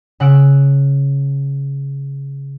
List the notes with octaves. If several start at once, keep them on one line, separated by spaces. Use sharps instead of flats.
C#3 F#5 E6 D7